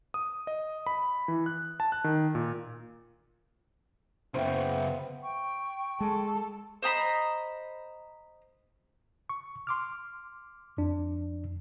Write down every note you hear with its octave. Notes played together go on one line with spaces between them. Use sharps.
D#6
D#5
B5
E3
F#6
A5
F#6
D#3
A#2
F#2 C#3 B3 C5 E5 F5 G5
G5 C#6
G#3 A4
C5 D#5 A#5 B5
C#6
C6 D6 F6
F2 D4